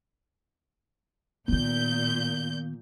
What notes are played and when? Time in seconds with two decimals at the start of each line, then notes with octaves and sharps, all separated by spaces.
1.48 A#2 D#3 B3 G6